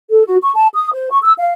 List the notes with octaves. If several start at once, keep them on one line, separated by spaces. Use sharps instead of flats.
A4
F#4
C#6
A5
D#6
C5
C#6
E6
F5